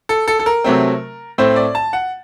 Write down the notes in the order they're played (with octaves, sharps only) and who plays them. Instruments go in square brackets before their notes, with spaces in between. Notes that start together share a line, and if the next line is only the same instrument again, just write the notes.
[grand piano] A4
A4
A4
A#4
C3 F#3 A3 C4
A2 A3 C4 C5
D5
A5
F#5